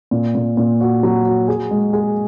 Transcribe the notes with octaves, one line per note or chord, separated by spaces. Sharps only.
A#2
A#2
A#2
F#4
F#3
F#4
G#4
G#3
G#4